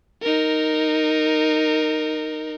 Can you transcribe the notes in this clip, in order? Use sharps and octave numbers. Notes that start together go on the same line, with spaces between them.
D#4 A#4